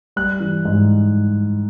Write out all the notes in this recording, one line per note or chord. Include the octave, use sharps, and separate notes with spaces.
G3 F#6
E3
G#2